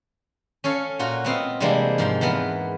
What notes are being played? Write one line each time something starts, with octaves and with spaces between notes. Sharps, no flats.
C#4 A4 C#5 F5
A#2 F4 F#4 A#5
B3 C4 D#5 F5
C3 E3 G3 G#3 A#3 D4
G#2 F3 A#5 C6
E2 E3 B3 A#4